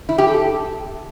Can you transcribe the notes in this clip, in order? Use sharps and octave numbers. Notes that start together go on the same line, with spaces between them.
E4
G4
A4